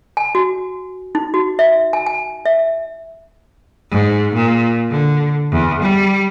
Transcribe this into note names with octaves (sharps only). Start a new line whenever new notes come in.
G#5
F#4
D#4
F#4
E5
G#5
G#5
E5
G#2
A#2
D3
E2
G3